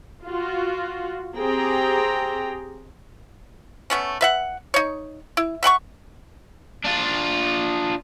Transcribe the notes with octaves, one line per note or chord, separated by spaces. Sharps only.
F4 F#4
C4 G4 G#4 G5 A#5
A3 B3 C#4
B4 E5 F#5
D#4 C#5
E4
E5 F#5 G5 C#6
D4 F4